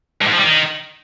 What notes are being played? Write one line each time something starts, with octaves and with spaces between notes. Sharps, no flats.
G2
G#2
F3
G3
D#3